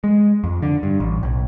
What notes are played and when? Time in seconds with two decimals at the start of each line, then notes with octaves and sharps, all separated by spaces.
0.04 G#3
0.44 F2
0.62 D3
0.83 G2
1.00 A1
1.23 B1